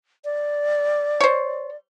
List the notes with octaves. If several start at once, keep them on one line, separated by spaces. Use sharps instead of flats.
D5
C5 C#5